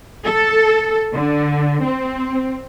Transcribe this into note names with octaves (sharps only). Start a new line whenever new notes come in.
A4
D3
C4